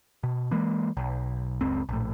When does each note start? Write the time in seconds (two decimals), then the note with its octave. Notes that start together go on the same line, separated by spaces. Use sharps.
0.23 B2
0.51 E3 G#3 A#3
0.97 B1
1.61 F#1 C#2 C4
1.89 A#1 A2